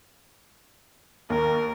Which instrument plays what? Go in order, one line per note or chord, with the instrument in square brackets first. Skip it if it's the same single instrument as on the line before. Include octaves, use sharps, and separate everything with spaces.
[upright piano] D#2 [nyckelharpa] A#4